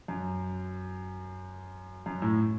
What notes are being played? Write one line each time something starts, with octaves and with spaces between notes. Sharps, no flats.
F#2
F#2
A2